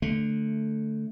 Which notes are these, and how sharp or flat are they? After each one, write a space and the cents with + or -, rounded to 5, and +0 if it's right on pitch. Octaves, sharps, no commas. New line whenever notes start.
D3 +0 A3 +0